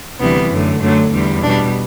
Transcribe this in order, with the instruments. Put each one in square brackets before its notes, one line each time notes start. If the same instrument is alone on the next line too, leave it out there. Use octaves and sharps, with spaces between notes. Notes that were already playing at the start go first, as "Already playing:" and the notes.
[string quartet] D2 C3 E3 G3 B3
F#2 D3 A3
F#2 D3 F#3 A3
E2 D3 G3
B2 G3 D4